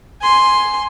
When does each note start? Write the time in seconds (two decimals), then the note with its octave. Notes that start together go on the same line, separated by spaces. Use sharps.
0.21 G#5 C6